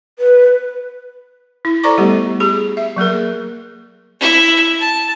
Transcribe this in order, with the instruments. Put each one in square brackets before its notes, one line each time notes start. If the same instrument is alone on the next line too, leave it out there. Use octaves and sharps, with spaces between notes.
[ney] B4
[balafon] E4
A4 C5 D5 A#5 C#6 D6
G3 A3 B3 G4
G4 G#4 B5
E5
F#3 A#3 G#4 A#4
[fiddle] E4
A5